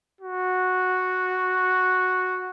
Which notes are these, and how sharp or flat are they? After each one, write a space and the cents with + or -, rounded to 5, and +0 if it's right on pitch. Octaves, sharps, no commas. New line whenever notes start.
F#4 -5